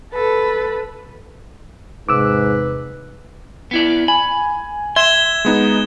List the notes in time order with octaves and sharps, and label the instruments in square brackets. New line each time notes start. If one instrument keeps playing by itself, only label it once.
[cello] A4 [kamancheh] B4
[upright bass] E2 C3 [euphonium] G#2 [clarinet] B4 [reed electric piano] D6 E6
[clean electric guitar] B3 E4 D5
[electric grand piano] G#5 [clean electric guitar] B5
[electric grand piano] E5 [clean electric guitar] C6 [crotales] G#6 E7 G7
[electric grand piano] G#3 B3 D#4